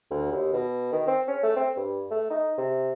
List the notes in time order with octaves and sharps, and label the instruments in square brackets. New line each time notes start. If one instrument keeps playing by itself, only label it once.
[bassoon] D2
D#2
B2
D#3
C4
C#4
A3
C4
G2
A3
D#4
C3